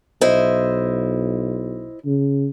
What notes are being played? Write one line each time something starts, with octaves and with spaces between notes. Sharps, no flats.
B1 E4 C5 D#5
C#3